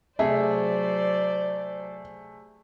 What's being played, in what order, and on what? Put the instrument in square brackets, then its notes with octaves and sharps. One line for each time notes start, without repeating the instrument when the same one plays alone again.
[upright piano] C3 A3 G#4 [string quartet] F#3 C5 D5 [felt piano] E5